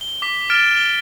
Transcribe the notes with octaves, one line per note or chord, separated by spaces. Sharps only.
G7
D6 B6
F6 A6 D7 E7
G7